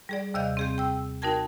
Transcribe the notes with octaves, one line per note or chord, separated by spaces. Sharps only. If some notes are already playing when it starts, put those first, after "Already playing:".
G3 G#4 D5
D#2 C3 D#5 F5 G6
C4 G#4 G6
G5 E6
D#4 F#4 A#4 G5 A5 G#6